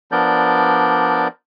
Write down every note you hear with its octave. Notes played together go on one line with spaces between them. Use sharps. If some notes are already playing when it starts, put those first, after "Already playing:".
F3 B3 D4 A#4 D5 G6